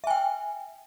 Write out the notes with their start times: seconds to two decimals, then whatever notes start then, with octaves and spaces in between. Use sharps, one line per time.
0.04 E5
0.07 G#5
0.10 G5